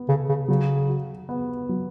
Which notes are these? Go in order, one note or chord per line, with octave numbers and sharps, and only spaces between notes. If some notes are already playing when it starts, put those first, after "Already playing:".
Already playing: B3
C#3 A4
C#3
C#3 F#3
F#4
B3
F#3